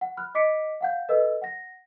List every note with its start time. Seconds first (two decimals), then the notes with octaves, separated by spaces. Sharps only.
0.01 F#5
0.17 B5 F6 F#6
0.35 D#5 D6 B6 C#7 D7
0.81 F5 F#5 G6
1.09 A4 B4 D#5 E6
1.42 F#5 A#6